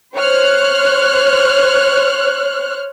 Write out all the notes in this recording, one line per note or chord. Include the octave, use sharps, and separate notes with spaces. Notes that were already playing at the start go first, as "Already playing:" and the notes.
C5 C#5 F6 F#6